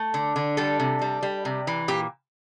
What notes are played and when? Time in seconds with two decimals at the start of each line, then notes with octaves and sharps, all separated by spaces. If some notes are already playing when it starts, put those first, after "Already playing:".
Already playing: A3
0.14 D3
0.36 D3
0.57 G3 A4
0.80 C3
1.02 G3
1.23 G3
1.45 C3
1.67 E3
1.88 A#2 G4